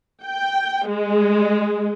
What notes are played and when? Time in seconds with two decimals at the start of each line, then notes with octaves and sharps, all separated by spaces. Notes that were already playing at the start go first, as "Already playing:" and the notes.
0.23 G5
0.86 G#3